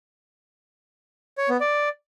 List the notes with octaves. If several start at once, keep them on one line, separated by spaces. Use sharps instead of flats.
C#5
B3
D5